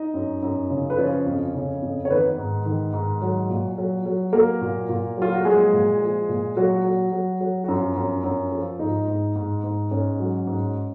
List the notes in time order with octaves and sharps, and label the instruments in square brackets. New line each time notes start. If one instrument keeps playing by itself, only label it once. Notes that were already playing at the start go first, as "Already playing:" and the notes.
Already playing: [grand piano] D#4 D#5
F#2
F#2
C#3
B4
F3 C#4 C#5
F2
C#3
F2
C#5
D#3 B3 B4
G#2
D#3
G#2
F#3
A#2
F#3
F#3
F#3 A#3 A#4
A#2
A#2
F#3 F4
F#4
F3 G#3 G#4
A#2
F3
A#2
A#2 F#3 F#4
F#3
F#3
F#3
F#4
F#2 F3 F4
F#2
F#2
F3
G#2 D#4
G#2
G#2
G#2
G#2 C#4
F#3
G#2